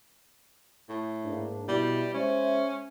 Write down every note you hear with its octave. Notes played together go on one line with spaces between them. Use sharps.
A2
G#2 A#3 D4
B2 G3 E4
G#3 C#4 C5 E5